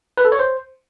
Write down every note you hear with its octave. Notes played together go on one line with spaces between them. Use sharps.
B4
A4
C#5
C5